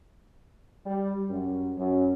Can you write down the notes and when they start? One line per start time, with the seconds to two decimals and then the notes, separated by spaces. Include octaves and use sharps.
0.86 G3
1.30 F#2
1.78 F#2